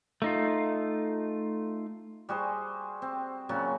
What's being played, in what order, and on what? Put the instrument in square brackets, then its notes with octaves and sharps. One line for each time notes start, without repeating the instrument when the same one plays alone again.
[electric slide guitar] A3 D#4 F4
[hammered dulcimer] G3 F#4 G#4 C5
C4
A#2 C#3 F#3 F#4